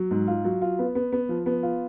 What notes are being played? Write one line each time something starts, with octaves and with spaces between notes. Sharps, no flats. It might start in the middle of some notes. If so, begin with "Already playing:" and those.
Already playing: F#3
G#2
F4
F#3
F4
B3
B3
B3
F3
B3
F4